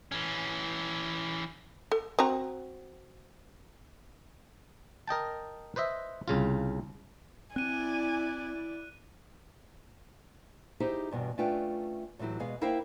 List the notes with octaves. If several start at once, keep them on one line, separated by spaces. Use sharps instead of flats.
E3 C#4
A4
C4 F#4 A#5
A#4 D#5 G5 A5
B4 C5 D#5 E5
C2 C#3 F4
C4 E4 D5 G#5 F#6 D#7
D#4 E4 G4 G#4 C5
E2 G2 B2
A3 C#4 D4 F4 B4 G5
A2 E3 F#3 E4 G4
B2 G#3 B3 G#4 F5
A#3 E4 A#4 C5 F5 G5